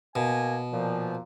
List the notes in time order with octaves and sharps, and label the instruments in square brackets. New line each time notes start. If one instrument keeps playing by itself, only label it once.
[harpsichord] B2 [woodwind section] A#3 G#5
[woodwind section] A#2 F3